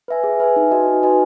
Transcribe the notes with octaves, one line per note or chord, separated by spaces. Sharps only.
B4 E5 G#5
G#4
B4 E5 G#5
D#4
F#4 B4 D#5 G#5
D#4
F#4 B4 D#5 G#5